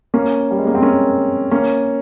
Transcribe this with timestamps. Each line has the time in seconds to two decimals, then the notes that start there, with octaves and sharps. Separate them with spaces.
0.14 A#3 C#4
0.51 G3
0.59 G#3
0.67 A#3
0.75 C4
0.82 A#3 C#4
1.51 A#3 C#4